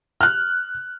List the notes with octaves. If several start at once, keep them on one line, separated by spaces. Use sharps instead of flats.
F6 F#6